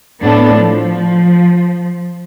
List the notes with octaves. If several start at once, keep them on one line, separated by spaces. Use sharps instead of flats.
A2 B3 D4 A4
F3